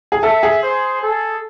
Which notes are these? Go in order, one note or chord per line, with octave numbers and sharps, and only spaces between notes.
G#4
A4 E5
G#4
C5
A4